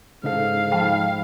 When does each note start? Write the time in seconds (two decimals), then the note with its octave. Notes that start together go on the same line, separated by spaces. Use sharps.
0.24 G#2 C#3 D#4 A4 F5
0.72 F3 G5 A5 B5